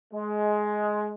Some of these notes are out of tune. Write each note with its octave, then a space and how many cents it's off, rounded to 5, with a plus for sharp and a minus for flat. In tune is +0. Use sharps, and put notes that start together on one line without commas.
G#3 +15